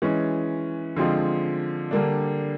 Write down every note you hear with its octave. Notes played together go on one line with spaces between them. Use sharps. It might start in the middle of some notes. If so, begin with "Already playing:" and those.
E3 G#3 C#4
D3 F3 G#3 C4 F4
D3 G3 A#3 D4